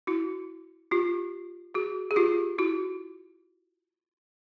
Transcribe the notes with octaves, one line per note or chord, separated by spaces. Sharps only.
E4 F#4
F4 G4
F#4 G#4
G#4
F4 G4
E4 F#4